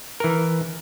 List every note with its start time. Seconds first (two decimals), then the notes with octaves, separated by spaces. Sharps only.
0.20 E3 A#4